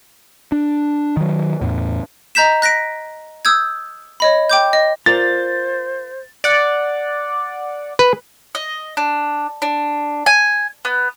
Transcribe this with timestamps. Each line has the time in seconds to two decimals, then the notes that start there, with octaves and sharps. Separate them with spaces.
0.52 D4
1.17 D#3 F#3
1.61 E2 A2
2.35 D#5 A#5 G6 B6 E7
2.62 F#6 A#6 B6 D7
3.45 D#6 E6 G6 G#6
4.20 C#5 D#5 B5
4.50 G5 D6 G6
4.73 D#5
5.06 F4 A#4 C5 D5 A6
6.44 D5 F#5
7.99 B4
8.55 D#5
8.97 D4
9.62 D4
10.26 G#5
10.85 B3